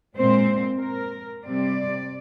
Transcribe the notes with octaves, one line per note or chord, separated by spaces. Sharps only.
A#2 G#3 C4 C5
A#4
C3 G3 C4 D5